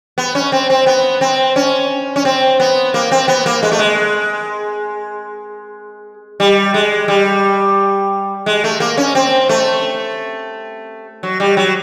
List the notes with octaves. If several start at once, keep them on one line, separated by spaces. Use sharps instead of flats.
B3
C#4
C4
C4
B3
C4
C#4
C#4
C4
B3
A#3
C4
B3
A#3
G#3
A3
G#3
G3
G#3
G3
G#3
A3
A#3
C#4
C4
A3
F#3
G3
F#3